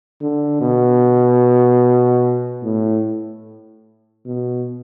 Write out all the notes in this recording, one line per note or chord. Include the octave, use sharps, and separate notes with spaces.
D3
B2
A2
B2